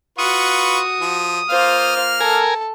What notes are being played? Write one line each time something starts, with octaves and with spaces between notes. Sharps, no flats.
F4 F#4 B4 C#6 D#6
F3
A#3 F4 C5 F6
A4 A#4 G#5